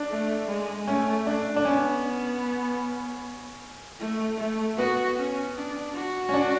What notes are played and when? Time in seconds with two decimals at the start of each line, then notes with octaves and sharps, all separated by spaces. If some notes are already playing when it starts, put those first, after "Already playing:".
Already playing: D4
0.09 A3
0.48 G#3
0.87 A3 C#4
1.26 D4
1.56 D4
1.65 B3 C#4
4.00 A3
4.38 A3
4.78 B3 F#4
5.17 C#4
5.56 D4
5.95 F#4
6.29 C#4
6.34 D4